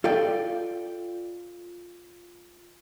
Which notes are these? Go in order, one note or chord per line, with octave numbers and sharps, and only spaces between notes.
F4 A4 D5 G5